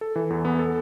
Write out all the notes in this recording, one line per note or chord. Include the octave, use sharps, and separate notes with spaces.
A4
E3
E2
B3
A4